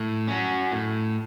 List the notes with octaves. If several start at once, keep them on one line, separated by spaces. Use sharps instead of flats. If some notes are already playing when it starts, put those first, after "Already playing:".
Already playing: A2
F#3 C#4
A2